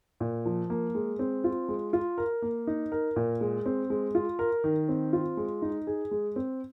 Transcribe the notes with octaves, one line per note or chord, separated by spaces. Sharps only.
A#2
F3
A#3
G#3
C4
F4
G#3
F4
A#4
A#3
D#4
A#4
A#2
G#3
C4
G#3
F4
A#4
D#3
C4
F4
G#3
D#4
G#4
G#3
C4